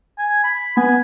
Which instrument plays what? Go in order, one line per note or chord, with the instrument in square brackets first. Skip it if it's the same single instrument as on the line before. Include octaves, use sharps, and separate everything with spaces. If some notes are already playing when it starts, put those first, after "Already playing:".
[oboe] G#5
B5
[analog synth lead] B3 [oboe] G#5